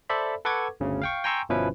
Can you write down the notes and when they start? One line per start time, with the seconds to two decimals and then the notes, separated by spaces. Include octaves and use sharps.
0.09 A4 C5 D5 E5 B5
0.45 A4 B4 F#5 C#6 D6 G#6
0.80 G1 D2 C#3
1.02 F5 G5 C#6
1.24 G5 G#5 A#5 C6 C#6 E6
1.49 G1 B2 F3 C#4 E4 B4